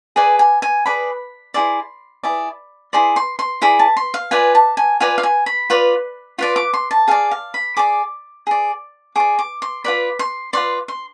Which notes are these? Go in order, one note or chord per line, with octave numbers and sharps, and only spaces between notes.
G#4 B4 D5 G#5
G#5
G#5
G#4 B4 D5 B5
E4 G#4 D5 C6
E4 G#4 D5
E4 G#4 D5 C6
C6
C6
E4 G#4 D5 B5
A5
C6
F5
F4 B4 D5 G#5
A5
G#5
F4 B4 D5 G#5
F5
G#5
B5
F4 B4 D5
F4 B4 D5 C6
D6
C6
A5
G#4 D5 F5
F5
B5
G#4 D5 D6
G#4 D5
G#4 D5 D6
D6
C6
F4 B4 D5 B5
C6
F4 B4 D5 C6
C6